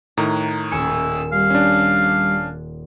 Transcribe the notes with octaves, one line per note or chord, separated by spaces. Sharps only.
A2 D#3 A#5 F#6
D#1 G#5 E6 C#7
G3 F5
C#4 D4